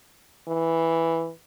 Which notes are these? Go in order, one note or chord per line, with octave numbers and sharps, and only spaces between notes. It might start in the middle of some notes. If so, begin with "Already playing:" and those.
E3